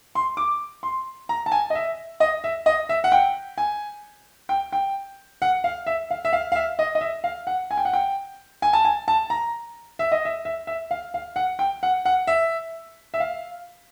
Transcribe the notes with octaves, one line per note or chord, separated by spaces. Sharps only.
C6
D6
C6
A#5
A5
G#5
D#5
E5
D#5
E5
D#5
E5
F#5
G5
G#5
G5
G5
F#5
F5
E5
F5
E5
F5
F5
E5
D#5
D#5
E5
F5
F#5
G#5
G5
F#5
G5
G#5
A5
G#5
A5
A#5
E5
D#5
E5
E5
E5
F5
F5
F#5
G5
F#5
F#5
E5
E5
F5